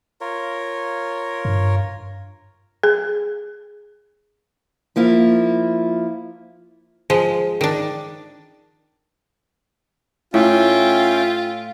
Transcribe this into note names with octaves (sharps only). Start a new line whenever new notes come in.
F4 A#4 C#5
G2
G#4
F3 A#3 E4 F4
F3 G#3
D#3 D4
A2 C#4 F4 E5 G5